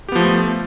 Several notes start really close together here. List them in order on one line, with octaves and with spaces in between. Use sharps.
G4 B3 F3 A3